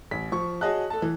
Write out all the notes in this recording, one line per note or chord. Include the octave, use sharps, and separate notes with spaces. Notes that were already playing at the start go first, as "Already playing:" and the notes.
A1 B6
F3 C#6
F#4 G#4 C#5 D#5 A5 F#6
A4 A5
E3